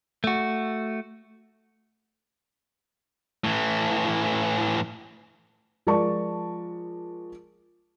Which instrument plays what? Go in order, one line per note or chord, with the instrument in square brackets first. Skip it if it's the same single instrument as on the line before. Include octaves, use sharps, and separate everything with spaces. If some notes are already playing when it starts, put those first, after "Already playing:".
[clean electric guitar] A3 F#4
[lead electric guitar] A2 E3
[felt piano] F3 G#3 A#4 D5 A5 C#6